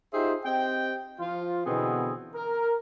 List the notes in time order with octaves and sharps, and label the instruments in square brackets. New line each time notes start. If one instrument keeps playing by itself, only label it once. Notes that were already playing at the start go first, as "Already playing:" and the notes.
[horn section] D#4 F4 G4 G#4 C5 E5
C4 G4 D#5 G5
F3 F4
B2 D3 E3 B3 C4 G#4
A#4